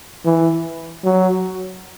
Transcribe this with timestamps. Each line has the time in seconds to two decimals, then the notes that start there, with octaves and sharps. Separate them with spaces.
0.25 E3
1.04 F#3